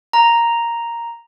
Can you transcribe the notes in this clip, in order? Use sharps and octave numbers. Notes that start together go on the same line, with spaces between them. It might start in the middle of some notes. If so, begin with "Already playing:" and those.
A#5